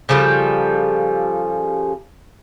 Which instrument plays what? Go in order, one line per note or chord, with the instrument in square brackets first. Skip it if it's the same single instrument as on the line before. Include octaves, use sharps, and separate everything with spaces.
[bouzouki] C#3 F3 G3 A4